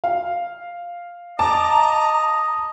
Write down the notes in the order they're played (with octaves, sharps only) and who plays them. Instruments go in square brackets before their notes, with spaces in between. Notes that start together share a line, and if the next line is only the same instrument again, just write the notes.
[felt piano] F5
[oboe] D#5 [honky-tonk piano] A5 D6 [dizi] A#5